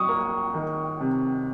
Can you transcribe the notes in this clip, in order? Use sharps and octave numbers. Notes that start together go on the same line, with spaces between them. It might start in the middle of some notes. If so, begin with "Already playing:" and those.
Already playing: F#3 C#6 D#6
A#3
D#3
C3